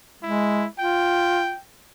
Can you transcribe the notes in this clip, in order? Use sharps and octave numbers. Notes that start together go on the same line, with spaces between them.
G#3 E4
F4 G5